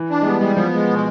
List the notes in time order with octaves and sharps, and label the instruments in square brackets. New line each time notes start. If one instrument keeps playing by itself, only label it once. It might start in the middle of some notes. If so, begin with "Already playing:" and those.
Already playing: [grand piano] E3
[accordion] D4
[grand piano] G#3
[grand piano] G3 [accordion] B3
[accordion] G3 [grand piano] G#3
[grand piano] F3 [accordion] B3
[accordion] G#3
B2